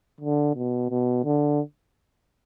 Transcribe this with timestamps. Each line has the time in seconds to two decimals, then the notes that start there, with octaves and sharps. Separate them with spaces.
0.21 D3
0.55 B2
0.90 B2
1.24 D3